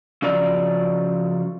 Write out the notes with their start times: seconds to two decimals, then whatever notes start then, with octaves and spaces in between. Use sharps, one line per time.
0.22 C#3 F3 F#3 D5 A#5